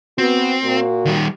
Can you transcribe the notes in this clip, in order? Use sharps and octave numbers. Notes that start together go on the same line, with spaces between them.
B3 C4 F#4
A#2 A#3 F#4
D#3 G3